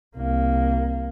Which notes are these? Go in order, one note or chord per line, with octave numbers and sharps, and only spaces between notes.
C2 A#3